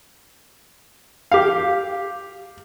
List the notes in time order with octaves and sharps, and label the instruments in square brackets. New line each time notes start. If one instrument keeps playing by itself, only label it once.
[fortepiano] G4 F5